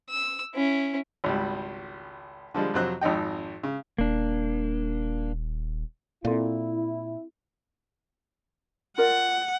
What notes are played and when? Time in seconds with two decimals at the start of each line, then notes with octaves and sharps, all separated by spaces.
0.10 E6
0.54 C#4 E4
1.24 G#1 C#2 G3
2.54 D3 F3 G3 G#3
2.74 F2 C3 F#3 C5 F#6
3.01 G#1 F2 D#4 G5
3.63 C#3
3.98 D#1 A#3 D4
6.25 A#2 C4 E4 A4 F5
8.98 F4 A#4 D5 F#5